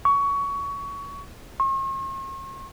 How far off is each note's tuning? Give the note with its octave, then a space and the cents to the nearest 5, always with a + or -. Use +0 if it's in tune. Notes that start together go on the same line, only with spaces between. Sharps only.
C#6 +20
C#6 -45